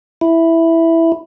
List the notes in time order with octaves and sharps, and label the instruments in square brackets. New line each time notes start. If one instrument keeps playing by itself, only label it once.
[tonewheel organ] E4